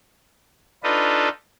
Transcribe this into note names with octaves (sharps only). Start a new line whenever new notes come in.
D4 D#4 F4 A4 B4 D#5